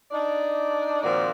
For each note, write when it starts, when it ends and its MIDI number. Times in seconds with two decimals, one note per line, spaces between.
0.11 1.00 62
0.11 1.00 63
0.11 1.00 74
1.03 1.31 46
1.03 1.31 51
1.03 1.31 53
1.03 1.31 60
1.03 1.31 66
1.03 1.31 74